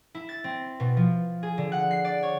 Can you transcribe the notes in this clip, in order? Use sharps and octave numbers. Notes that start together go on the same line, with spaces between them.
E4
A6
C4
B2
F3
G#4
D3
F#5
C7
D5
C#5